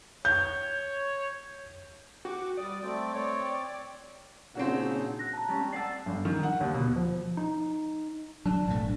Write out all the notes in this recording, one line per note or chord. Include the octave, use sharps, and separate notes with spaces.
C#5 G6
F#4 G5 D6
G3 D5 D#6
A3 C4 G5
C#5
A#2 C#3 F#3 C4 D4 D#4 F#4
F#6 A#6
A5 A#5
G3 G#3 C#4
C4
D5 F#5 A5 E6 C7
G1
D#3
F#5
D#2
B2
F3
D#4
F#3 D4
D#1 G#1 A3